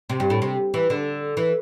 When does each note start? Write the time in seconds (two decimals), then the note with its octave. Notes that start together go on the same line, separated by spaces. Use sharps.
0.09 C3
0.20 G2
0.30 A2
0.42 C3
0.74 E3
0.90 D3
1.37 E3